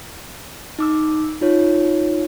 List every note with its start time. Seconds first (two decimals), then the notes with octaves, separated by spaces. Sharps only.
0.79 D#4 D6 E6
1.41 D#4 F4 C#5